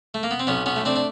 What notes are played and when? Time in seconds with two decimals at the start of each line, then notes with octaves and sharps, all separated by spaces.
0.14 A3
0.23 A#3
0.31 B3
0.39 C4
0.47 B1 B3 C#4
0.66 B3 C#4
0.76 A3
0.85 C4 D4
0.96 D4